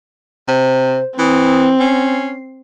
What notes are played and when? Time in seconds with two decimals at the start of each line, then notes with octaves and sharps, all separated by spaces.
0.48 C3 C5
1.19 E3 C4 D#6
1.80 C#4 C7